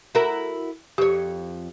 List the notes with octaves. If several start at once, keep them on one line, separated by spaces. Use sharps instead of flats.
E4 F#4 A#4
F2 G4 C#5